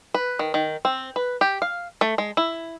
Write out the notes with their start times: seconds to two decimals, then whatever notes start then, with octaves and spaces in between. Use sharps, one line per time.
0.14 B4
0.39 D#3
0.54 D#3
0.85 C4
1.16 B4
1.41 G4
1.62 F5
2.01 A3
2.18 G#3
2.37 E4